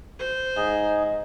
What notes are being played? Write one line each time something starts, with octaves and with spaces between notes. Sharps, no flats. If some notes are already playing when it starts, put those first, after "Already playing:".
C5
G#2 D#4 G#4